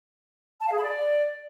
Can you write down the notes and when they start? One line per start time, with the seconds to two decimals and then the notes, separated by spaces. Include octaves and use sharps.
0.61 A5
0.66 F5
0.72 G#4
0.77 B5
0.83 D5